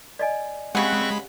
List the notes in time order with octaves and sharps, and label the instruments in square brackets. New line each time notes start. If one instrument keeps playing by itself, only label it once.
[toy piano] D5 D#5 G#5
[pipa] C#3 F#5 [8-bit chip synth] G#3 B5 [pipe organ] C4 C#6 F#6 [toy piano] G4